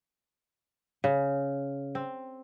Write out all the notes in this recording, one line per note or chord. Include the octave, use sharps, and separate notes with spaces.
C#3
C4